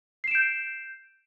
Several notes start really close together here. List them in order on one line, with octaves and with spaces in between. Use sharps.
C7 E7 D7 G6